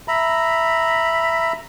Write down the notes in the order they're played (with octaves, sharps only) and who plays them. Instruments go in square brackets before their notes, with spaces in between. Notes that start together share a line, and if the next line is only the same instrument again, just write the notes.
[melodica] E5 A#5 B5